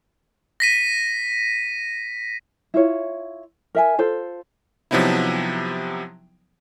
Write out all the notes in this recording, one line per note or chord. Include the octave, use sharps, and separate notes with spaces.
A#6 B6 D#7
E4 F4 C#5
A#4 E5 G#5
F4 A4 C5
C3 F3 F#3 B3 D#4 E4